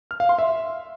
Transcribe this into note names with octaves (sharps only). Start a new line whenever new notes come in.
F6
F5
C6
E5